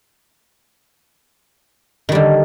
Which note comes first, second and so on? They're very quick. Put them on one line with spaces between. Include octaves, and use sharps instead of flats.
D#3 G3 D3